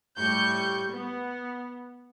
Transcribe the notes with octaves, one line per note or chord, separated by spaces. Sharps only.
A2 G3 C#6 G6
B3